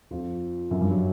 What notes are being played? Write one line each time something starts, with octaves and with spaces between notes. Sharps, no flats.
F2 F3
F#2 F#3
G2 G3
F#3